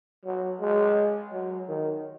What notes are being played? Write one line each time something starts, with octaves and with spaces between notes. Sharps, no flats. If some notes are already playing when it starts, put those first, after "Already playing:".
F#3
G#3
F#3
D#3